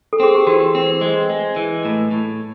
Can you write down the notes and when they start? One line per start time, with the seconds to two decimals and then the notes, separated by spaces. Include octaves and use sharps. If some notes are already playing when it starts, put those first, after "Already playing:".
0.13 A4
0.20 C4 G#4
0.35 G4
0.47 E3 F#4
0.75 C4
1.01 G#3
1.30 G#3
1.56 E3
1.85 A2
2.11 A2